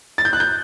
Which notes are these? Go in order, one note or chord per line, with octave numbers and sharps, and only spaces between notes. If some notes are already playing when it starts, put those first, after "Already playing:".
A6
G6
F#6
G6